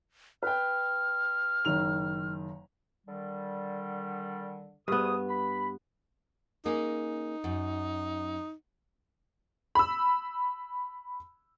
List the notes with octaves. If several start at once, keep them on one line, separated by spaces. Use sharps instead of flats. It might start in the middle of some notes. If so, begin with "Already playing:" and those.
B4 G5 F6
F#1 D#3 F7
D3 D#3 G3
D2 G2 B3 G#4 D#6
B5
A#3 C#4 D#4 G#4
F#2
B5 E6